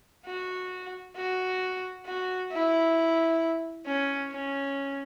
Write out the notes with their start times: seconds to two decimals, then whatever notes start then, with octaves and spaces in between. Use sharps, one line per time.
0.25 F#4
1.16 F#4
2.06 F#4
2.52 E4
3.86 C#4
4.31 C#4